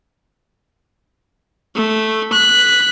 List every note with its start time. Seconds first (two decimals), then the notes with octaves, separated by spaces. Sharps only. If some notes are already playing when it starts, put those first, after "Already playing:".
1.75 A3
2.33 F#6 B6